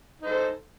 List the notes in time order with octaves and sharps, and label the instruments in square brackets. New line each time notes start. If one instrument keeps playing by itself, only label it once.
[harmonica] D#4
C5
A4